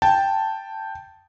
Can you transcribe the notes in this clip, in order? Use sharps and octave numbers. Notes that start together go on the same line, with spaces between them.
G5 A5